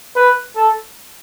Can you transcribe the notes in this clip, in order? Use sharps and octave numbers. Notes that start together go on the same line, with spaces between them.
B4
A4